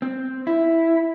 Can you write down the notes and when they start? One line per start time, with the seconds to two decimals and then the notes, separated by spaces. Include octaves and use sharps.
0.02 C4
0.47 E4